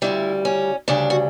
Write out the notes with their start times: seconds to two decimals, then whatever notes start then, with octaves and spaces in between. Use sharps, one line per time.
0.02 D2 C#3 G3 E4
0.45 C#4
0.88 D2 C#3 G3 D4
1.10 F#4